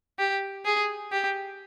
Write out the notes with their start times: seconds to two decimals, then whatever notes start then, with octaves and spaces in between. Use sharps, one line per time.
0.19 G4
0.65 G#4
1.12 G4